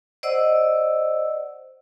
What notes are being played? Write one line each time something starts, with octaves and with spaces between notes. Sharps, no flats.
C5 D5 D#5 F#5 E6